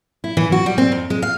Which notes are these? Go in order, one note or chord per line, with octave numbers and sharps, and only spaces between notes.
E4
E3
F#4
G3
C4
F2
G#3
F5